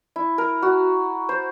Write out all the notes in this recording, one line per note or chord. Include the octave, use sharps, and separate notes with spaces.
E4
A#4
F#4
C5